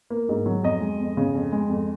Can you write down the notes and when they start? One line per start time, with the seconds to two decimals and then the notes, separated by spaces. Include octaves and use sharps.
0.10 A#3
0.29 G#2
0.46 F#3
0.63 F2 D#5
0.81 G#3
1.00 F2
1.17 C#3
1.35 F2
1.52 G#3
1.70 F2